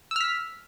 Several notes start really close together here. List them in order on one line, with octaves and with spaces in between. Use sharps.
E6 F6 B6